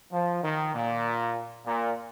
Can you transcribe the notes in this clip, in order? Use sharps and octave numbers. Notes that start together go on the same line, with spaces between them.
F3
D#3
A#2
A#2